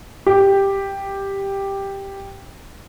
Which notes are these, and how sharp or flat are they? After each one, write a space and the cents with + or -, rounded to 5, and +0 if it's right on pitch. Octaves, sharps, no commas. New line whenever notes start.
G4 +5